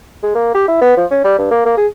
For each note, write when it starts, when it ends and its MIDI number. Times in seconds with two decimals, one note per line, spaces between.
0.23 0.30 56
0.35 0.53 58
0.54 0.63 67
0.68 0.79 64
0.81 0.96 59
0.97 1.06 53
1.11 1.21 61
1.24 1.37 55
1.38 1.51 43
1.51 1.62 58
1.65 1.73 58
1.77 1.87 68